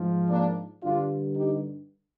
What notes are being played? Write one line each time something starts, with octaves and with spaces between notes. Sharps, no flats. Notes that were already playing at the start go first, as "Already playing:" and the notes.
Already playing: G#2 F3
A#3 D4
G2 D3 G3 D4 F4
D#4 G4